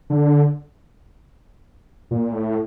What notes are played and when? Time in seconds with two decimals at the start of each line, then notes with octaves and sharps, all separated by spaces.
0.10 D3
2.11 A#2
2.32 A2